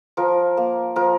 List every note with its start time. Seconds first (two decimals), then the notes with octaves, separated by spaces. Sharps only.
0.17 F3 A#4
0.57 A#3
0.96 F3 A#4